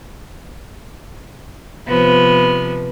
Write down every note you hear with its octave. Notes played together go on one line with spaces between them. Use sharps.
C3 F3 B3